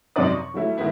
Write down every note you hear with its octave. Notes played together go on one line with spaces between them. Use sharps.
F#2 C3 C4 D#4 D5 D#6
C#6
F#3 G3 A3 E4
D#3 G#3 B3 E4